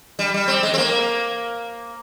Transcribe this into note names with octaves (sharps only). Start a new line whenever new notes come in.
G3
G3
C4
G#3
C4
A#3